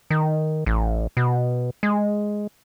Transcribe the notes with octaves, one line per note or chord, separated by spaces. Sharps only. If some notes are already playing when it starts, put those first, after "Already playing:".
D#3
A1
B2
G#3